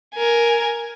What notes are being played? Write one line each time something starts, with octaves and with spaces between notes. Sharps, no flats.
A#4 G#5